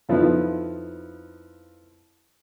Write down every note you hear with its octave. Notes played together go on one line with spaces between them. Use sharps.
F2 F3 B3 D#4 E4